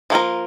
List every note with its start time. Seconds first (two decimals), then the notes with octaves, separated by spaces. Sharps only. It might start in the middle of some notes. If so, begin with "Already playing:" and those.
0.10 F3 A#3 C#4 F4 A#4